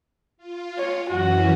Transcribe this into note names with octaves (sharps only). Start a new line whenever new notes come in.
F4
C#5
F#2 E3 C#4 F#4